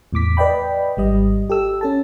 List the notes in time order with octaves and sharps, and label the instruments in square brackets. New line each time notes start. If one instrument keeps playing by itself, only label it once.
[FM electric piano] E2 A2 D6 B6
B4 D5 D#5 G5 B5
G#1 G3 D#5
G4 A4 E6
C#4 A4 A5